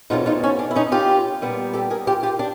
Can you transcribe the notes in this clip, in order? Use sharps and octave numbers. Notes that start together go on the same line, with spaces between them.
E2 B2 F#3 A3 C4 D#4 F4
D#4 F4
C#4
D4
E4
C#4 D#4
F4 G4
A#2 G3 B3
G4 A4
G#4 A#4
F4 G4
F4 G4
D4